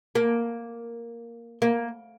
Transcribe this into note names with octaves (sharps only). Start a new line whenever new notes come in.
A#3
A#3